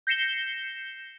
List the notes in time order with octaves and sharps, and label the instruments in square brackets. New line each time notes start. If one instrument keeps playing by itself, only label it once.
[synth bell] G6 A#6 C7 C#7 E7 G7